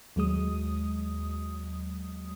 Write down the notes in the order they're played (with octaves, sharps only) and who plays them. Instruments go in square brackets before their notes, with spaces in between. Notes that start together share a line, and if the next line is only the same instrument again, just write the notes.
[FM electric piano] D#2 F#3 G#3 D#6